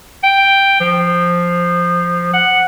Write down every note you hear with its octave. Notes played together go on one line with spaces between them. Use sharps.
G5
F3
F#5